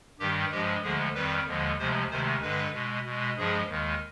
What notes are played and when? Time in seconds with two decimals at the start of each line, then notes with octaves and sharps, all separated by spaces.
0.20 G2 D#3 G3 G4
0.52 G2 F3 G#3 G4
0.83 D2 D3 F3 G#3 G#4
1.15 F2 D#3 G3 B4
1.47 D#2 D3 F3 G#3
1.78 D2 C3 F3 G#3 C5
2.10 D2 C3 D#3 G#3 C5
2.42 G2 D3 G#3 B4
2.74 B2 G#3
3.05 B2 G#3
3.37 G2 F3 G#3 G#4
3.69 D#2 D#3 G#3